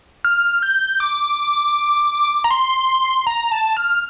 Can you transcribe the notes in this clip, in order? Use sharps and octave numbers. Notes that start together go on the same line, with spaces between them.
F6
G6
D6
A#5
C6
A#5
A5
F6